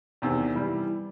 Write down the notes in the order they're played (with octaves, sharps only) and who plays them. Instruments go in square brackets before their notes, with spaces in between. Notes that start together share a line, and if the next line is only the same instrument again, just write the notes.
[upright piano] E2 C3 D#3
E3 G3